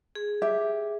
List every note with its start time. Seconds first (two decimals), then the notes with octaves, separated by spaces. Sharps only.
0.15 G#4
0.42 G4 E5